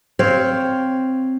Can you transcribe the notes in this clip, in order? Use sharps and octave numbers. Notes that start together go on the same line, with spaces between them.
C4 C5 C#5 F5